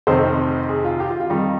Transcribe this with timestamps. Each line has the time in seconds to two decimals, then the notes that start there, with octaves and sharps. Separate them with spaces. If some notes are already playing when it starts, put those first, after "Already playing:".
0.07 F1 F2 C3 D#3 C5
0.69 G#4
0.85 F4
1.00 G4
1.10 F4
1.20 F4
1.30 F2 D#3 G3 D#4